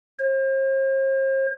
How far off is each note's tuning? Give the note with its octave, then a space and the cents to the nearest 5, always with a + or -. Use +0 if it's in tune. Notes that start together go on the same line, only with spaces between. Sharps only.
C5 +45